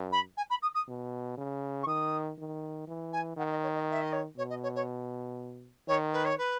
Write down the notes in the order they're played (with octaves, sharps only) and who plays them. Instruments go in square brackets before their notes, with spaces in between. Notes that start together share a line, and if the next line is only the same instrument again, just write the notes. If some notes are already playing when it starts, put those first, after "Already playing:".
Already playing: [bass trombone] F#2
[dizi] B5
G#5
B5
D#6
D#6
[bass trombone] B2
C#3
[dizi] C#6
[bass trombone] D#3 [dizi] D#6
[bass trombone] D#3
E3
[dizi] G#5
[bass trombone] D#3 [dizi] F#5
[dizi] D#5
C#5
D#5
E5
D#5
C#5
[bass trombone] B2 [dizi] C#5
[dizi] D#5
C#5
C#5
[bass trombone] D#3 [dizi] C#5
[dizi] B4
C#5
B4